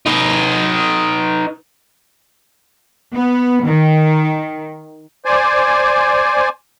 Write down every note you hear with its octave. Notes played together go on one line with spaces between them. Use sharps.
D#4 B4
B3
D#3
C5 D5 G#5